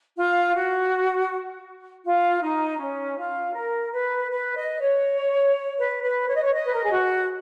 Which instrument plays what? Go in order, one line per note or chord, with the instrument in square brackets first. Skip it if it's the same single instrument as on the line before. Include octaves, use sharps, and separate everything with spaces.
[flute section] F4
F#4
F4
D#4
C#4
F4
A#4
B4
B4
D#5
C#5
B4
B4
C#5
D#5
C#5
D#5
B4
A#4
G#4
F#4